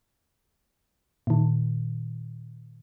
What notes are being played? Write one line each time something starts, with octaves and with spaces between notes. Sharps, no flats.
A#2 D#3